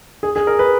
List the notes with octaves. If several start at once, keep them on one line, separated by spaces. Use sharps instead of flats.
G#4
G#4
A#4
B4